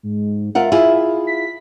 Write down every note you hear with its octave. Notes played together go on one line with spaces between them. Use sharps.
G#2
F4 A#4 E5 F#5
E4 F4 G#4
B6